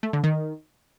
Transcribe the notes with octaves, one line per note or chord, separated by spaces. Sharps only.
A3
D3
D#3